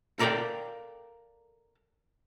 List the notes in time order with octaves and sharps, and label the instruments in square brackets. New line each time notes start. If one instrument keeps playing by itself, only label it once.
[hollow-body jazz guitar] A4 A#4 D5 E5 F5 G5